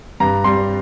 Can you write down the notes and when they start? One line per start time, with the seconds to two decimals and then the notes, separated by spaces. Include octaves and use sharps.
0.20 G2 A#5
0.44 G3 C6